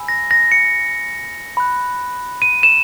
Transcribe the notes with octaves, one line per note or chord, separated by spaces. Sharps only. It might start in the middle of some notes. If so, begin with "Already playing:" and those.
Already playing: G#5 B5 E6
A#6
A#6
C#7
B5 F#6
D#7
E7